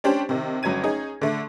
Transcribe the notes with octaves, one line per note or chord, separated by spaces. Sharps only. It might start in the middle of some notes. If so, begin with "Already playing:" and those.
C#4 D4 G4 C5
C3 D#3
G1 F#3 C#4 G#6 D#7
C#4 D#4 G#4
D3 A3